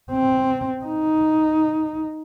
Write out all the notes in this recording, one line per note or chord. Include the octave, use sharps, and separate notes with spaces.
C4
D#4